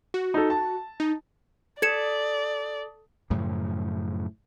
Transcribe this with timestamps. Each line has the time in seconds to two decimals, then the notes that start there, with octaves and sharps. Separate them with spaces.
0.14 F#4
0.34 D#4 A4
0.50 A5
1.00 D#4
1.82 A4 D5 G#6 C#7 E7
3.30 F#2 A2 C#3 F3